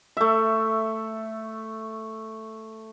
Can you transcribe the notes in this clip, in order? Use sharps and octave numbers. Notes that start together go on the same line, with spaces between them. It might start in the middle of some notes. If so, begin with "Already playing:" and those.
A3 E5